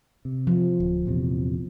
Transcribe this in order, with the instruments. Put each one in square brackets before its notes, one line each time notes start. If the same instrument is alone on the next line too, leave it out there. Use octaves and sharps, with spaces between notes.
[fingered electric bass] C3
[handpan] F3
[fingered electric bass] D1
A#1 E2 C3